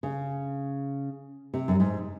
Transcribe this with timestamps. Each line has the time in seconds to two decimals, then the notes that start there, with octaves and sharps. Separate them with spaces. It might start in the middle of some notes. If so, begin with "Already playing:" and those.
0.03 C#3
1.54 C3
1.68 F#2
1.80 G#2